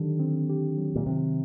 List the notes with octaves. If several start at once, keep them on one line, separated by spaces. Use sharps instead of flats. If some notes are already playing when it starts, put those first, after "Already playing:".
Already playing: D3 D#3 F#3 G4
C4
G4
F#3
A#2
C3 D#3